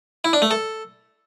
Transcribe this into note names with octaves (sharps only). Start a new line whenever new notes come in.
E4
D4
A3
A4